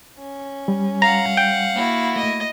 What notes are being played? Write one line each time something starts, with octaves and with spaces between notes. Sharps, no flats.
C#4
G3
F5 F#5 A#5
G5
A#3 E4 F#4
A3 D#5